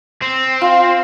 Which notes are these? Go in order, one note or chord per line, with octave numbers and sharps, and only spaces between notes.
C4
F4